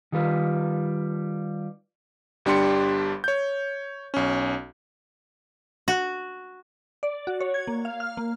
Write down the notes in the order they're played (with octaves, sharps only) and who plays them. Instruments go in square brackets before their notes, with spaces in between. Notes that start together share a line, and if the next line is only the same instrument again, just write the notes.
[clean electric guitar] D#3 G3 F4 B4
[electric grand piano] G1 G3 D4 G4 C6 C#7
C#5 G6
B1 C#4
[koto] F#4
[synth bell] D5
F#4
C#5
G#6
A#3
F5
F6
A#3